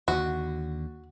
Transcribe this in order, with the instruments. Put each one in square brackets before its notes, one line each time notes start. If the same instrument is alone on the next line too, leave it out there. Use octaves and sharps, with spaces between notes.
[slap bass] D#2 D3 [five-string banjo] F#4